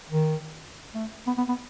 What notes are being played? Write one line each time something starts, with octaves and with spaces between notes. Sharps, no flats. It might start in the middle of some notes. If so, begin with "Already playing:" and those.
D#3
A3
B3
B3
B3